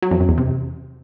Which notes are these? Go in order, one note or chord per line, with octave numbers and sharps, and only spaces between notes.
F#3
F2
F#2
E2
C3